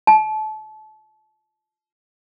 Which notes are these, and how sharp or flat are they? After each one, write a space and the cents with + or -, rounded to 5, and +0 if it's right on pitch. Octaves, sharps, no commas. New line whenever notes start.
A5 -30